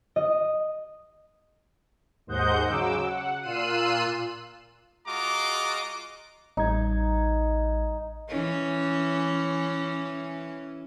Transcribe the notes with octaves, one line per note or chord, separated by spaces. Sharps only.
D#5
D#2 G#2 C5 D#5 F#5 G6
C#3 F#3 D6 E6
F#5
A#2 F4 E6 F#6 C7 D#7
G#3 F4 F#4 D#5 A#5 D6
A1 G3 D#4 G#6
E3 C#4